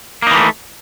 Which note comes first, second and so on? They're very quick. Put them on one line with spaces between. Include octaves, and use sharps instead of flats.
A#3 D#4 E3 A3